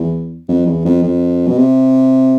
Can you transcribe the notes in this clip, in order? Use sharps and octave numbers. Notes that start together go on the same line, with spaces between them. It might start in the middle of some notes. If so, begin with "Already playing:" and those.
Already playing: E2
F2
E2
F2
F2
B2
C3